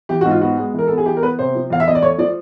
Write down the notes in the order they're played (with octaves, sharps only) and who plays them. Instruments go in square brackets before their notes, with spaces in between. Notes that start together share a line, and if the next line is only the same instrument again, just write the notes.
[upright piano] E3 G4
F#4
G#2
F4
B3 F#4
G#3
E3 A#4
B3 A4
G#4
E3 G4
A#4
B3 B4
C3 C5
F3
E2 F5
E5
E2 D#5
D5
A3 C#5
F3 D5